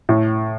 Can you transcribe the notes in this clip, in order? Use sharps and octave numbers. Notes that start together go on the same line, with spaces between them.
A2